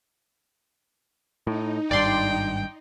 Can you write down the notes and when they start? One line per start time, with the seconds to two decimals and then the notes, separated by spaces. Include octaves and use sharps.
1.47 A2 D#4
1.91 G#1 G2 D5 G5 C6